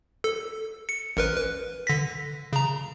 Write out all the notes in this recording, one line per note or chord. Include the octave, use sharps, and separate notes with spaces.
A4
C#7
A1 A#4 B4
B4
D3 A#6 B6
C#3 A#5